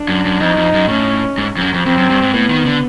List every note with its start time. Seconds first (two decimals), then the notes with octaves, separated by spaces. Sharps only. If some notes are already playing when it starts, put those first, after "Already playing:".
Already playing: D4
0.08 F#2
0.25 F#2
0.40 F2 D#4
0.57 F2
0.74 F#2
0.88 A2 C#4
1.38 G#2
1.57 F2
1.61 F#2
1.74 F2
1.86 F2 C4
1.97 F#2
2.10 G2
2.22 G#2
2.33 A2 B3
2.50 D#3
2.66 D3